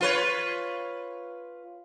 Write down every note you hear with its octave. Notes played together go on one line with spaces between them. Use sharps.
F4 B4 C#5